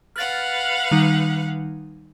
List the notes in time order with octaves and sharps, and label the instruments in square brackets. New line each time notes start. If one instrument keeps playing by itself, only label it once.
[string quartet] B4 F5 F#5 [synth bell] F6 A6
[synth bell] D#3 G3 D#4